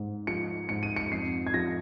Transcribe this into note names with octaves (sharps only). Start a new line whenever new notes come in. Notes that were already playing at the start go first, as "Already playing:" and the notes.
Already playing: G#2
F3 C#7
G#2 C#7
D#7
C#7
F2 C7
G#6
F3 A#6